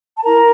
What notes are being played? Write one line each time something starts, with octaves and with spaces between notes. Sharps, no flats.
A5
E4 A#4 A#5